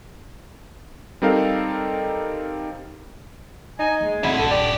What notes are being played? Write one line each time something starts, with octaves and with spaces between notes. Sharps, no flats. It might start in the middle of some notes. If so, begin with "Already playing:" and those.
G3 C4 D#4 A4 A#4 F5
D#4 G#5
G#3 A#3
F2 C4 D4 E4 F#4
A#1 A4
D#1 G2 D4 F#4 G4 D5